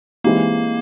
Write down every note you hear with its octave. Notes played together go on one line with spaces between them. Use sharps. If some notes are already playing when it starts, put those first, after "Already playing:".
E3 G#3 A#3 C4 D#4 G4